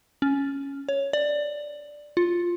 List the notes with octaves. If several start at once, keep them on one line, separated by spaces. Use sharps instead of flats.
C#4
C#5
D5
F4